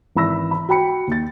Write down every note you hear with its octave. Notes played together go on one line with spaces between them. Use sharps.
G#1 E3 B5 E6 A#6
B5
F#4 G5 B5 C#7
D#2 A6